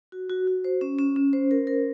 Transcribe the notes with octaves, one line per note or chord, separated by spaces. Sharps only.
F#4
F#4
F#4
C5
C#4
C#4
C#4
C5
A#4
A#4